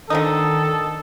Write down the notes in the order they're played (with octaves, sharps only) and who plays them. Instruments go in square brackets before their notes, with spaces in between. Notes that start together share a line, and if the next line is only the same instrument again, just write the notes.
[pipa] D3 F3 D#4 [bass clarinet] D#3 [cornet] A4 [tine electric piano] D#6